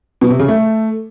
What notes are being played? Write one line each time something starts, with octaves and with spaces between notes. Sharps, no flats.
B2
C3
C#3
A3